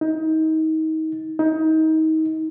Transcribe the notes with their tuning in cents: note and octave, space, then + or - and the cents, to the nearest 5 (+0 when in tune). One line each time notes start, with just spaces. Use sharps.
D#4 +30
D#4 +30